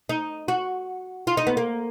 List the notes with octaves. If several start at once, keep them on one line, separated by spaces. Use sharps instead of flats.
D#4
F#4
F4
D#4
B3
A#3